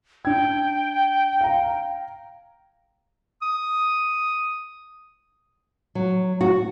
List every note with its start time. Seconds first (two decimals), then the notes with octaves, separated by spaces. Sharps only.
0.25 D4 G5 G#6
1.41 F5 A#5
3.42 D#6
5.95 F#3
6.41 F#4